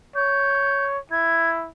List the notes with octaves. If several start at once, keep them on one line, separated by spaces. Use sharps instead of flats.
C#5 G6
E4 G#6